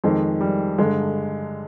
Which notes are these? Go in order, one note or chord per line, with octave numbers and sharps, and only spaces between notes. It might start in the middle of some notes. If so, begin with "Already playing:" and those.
F2 D#3 G#3
G3
G2 D3 G#3